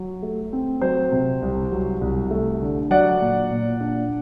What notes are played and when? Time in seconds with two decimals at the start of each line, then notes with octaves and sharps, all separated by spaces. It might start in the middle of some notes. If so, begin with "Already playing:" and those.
Already playing: F#3
0.23 A3
0.53 C4
0.82 F#3 C5
1.12 C3
1.42 C2
1.72 F#3
2.01 C2
2.31 A3
2.62 D3
2.90 F#3 D5 F#5
3.21 A#2
3.51 A#2
3.81 D4